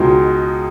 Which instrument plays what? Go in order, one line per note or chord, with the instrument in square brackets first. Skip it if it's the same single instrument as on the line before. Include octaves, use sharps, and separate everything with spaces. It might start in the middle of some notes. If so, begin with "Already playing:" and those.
Already playing: [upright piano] C#2 B2 G#3 D#4